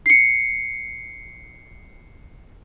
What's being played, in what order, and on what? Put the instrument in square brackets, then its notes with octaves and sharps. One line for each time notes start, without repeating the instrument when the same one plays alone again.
[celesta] C7 C#7